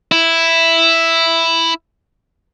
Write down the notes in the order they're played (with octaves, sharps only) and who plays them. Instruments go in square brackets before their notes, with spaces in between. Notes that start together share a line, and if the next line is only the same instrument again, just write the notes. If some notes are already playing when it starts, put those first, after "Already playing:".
[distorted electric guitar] E4